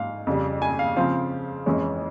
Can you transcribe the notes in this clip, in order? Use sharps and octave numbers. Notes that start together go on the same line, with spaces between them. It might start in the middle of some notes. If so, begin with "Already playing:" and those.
Already playing: G#2 F5
F2 C#3 G3
G#5
F5
C#3 F3 C4 F5
F2 E3 G#3 C#4